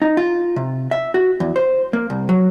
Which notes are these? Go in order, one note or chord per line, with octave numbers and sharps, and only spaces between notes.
D#4
F4
C3
E5
F#4
E2
C5
A#3
C2
F#3